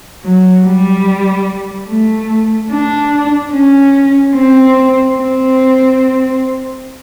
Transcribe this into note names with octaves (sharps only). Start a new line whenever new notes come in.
F#3
G3
A3
D4
C#4
C4
C4